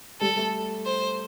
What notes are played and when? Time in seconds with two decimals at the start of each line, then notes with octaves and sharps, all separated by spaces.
0.21 G3 A4
0.37 A3
0.86 C5